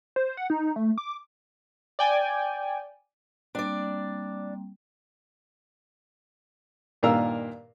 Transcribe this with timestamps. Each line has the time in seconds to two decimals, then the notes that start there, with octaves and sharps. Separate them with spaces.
0.16 C5
0.37 F#5
0.50 D#4
0.76 A3
0.98 D6
1.99 D5 G5 G#5
3.55 G3 A#3 C4 D4 D5
7.03 G2 A#2 D#3 A#4 F5 E6